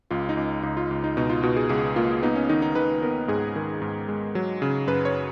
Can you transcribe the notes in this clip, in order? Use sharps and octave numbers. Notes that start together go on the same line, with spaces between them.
C#2 F4
D#4
C#2
C#2 D#4
F4
C#2
D#4
B2 D#4
F4
B2 F#4
G#4
C#2 G#4
A#3 F4
B3 D#4
C#4
D#3 D#4
D#4
D#3 B4
B3 A#4
G#2 G#4
D#3
G#2
G#3
F#3
C#3
F#2 B4
C#5